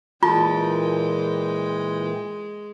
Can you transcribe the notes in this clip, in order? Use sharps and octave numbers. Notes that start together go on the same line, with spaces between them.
A#2 E3 G#3 F4 G5 A5